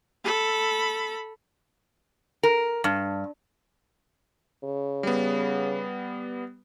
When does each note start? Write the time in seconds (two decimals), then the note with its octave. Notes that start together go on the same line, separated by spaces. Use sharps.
0.24 A4 B5
2.43 A#4
2.84 G2
4.64 C#3
5.03 G3 B3